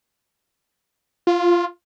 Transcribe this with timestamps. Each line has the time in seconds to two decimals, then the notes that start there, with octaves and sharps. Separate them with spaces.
1.27 F4